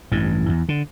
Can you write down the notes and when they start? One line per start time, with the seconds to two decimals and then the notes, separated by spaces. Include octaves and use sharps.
0.12 A1 G2 E3
0.49 E2
0.69 D3